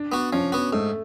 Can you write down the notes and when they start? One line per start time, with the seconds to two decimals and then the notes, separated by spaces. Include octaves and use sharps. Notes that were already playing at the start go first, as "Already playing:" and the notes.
Already playing: D4
0.12 B3 F#4
0.33 F3 C#4
0.52 B3 F#4
0.73 G#2 A3